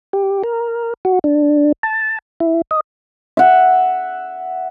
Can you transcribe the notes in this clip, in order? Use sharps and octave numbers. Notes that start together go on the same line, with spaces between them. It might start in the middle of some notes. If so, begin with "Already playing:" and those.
G4
A#4
F#4
D4
A5
E4
D#5
E5 F#5